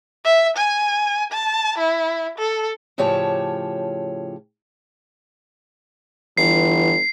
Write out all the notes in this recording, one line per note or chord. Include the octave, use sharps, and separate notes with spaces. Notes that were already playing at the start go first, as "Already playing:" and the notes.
E5
G#5
A5
E4
A4
A2 C#3 F3 G4 C#5 A5
G1 E3 C7